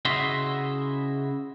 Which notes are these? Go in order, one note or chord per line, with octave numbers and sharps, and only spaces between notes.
C#3 E4 F#4 D#5 E5 C6